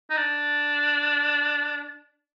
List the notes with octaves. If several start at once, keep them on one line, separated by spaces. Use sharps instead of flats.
D#4
D4